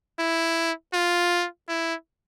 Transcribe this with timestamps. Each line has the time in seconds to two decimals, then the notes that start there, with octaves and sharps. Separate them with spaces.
0.19 E4
0.93 F4
1.68 E4